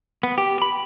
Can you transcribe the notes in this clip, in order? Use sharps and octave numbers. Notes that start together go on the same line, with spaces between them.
B3
G4
B5